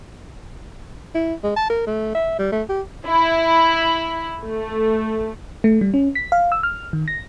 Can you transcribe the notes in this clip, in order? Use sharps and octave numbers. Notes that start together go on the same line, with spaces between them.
E4
G#3
A5
A#4
A3
E5
G3
A3
G4
E4
A3
A3
G3
C#4
B6
F5
E6
F6
D#3
A#6